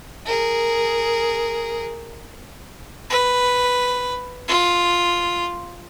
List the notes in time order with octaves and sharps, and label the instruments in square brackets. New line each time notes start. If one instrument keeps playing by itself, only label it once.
[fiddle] G#4 A#4
[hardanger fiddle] B4
F4